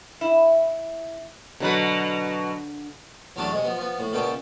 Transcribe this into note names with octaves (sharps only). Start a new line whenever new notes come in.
E4
B2 D3 F#3 B4
E2 A2 F#3 G3 D4 A5
C3 G#3
F3 B3
F3 B3
A2
C#2 A#2 C#3 B3 G5 A5